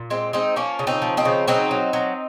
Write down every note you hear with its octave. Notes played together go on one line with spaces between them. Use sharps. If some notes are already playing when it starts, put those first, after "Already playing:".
Already playing: A#2
G#3 C4
G#3 C4 D#4
F3 A#3 C#4
C#3
C4 D#4
F3
C4 D#4
C#3
F#3 C4 D#4
F#3
F#3